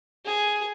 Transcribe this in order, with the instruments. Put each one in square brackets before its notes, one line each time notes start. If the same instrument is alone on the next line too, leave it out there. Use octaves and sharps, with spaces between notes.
[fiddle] G#4